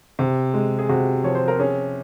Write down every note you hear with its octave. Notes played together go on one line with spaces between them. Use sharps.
C3
G#3
G#4
C3 F#4
F3 C#5
C5
A#4
C#4 G#4